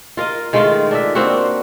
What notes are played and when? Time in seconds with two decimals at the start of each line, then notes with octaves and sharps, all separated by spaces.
0.17 F4 A#4 D#5
0.53 D#3 G#3 A3 F4
0.91 D4 A#4 E5
1.15 A#3 C4 D4 F#4